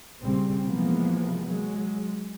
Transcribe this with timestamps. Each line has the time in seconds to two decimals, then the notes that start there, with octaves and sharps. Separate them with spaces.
0.19 A#1 A#2 C#3 G3 C4
0.65 C3 E3 F3 G#3 A#3 B3
1.47 F#3 G#3